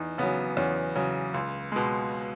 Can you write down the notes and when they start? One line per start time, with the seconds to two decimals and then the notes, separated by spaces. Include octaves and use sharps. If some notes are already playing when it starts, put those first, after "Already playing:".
Already playing: E2 D#4
0.18 C#3 F#3 B3
0.57 E2 C#4
0.95 C#3 F#3
1.34 C#2
1.72 B2 G#3